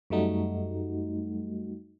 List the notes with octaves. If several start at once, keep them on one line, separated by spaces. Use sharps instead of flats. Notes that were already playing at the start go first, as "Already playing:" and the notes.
F#2 G3 A3 D#4 F#4